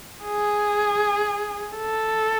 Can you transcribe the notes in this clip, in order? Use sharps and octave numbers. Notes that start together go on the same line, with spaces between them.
G#4
A4